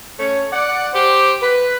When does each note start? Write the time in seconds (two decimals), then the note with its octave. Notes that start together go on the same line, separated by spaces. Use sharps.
0.18 A3 C#4 C#5
0.52 D5 F#5
0.94 G4 C5
1.41 B4